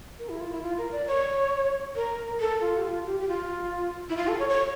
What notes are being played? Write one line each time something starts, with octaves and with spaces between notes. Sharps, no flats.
A#4
E4
F4
E4
F4
A#4
D5
C#5
A#4
A4
F4
G4
F4
G4
G4
F4
E4
F4
A4
C#5
C#5